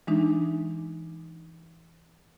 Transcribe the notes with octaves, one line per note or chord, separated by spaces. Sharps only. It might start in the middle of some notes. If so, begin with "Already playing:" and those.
E3 G#3 D4 D#4